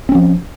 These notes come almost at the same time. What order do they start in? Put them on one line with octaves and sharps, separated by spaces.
C4 C#4 F3